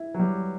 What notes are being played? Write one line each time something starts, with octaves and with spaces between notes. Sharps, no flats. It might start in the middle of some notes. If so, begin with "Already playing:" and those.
Already playing: E4
F#3
G3